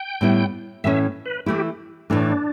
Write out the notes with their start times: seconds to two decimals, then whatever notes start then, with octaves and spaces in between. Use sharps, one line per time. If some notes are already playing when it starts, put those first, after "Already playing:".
Already playing: G5
0.21 A2 G3 B3 E4
0.84 A2 E3 A3 C#4 E5
1.26 B4
1.46 E3 A3 E4 G4
2.10 A2 E3 A3 D4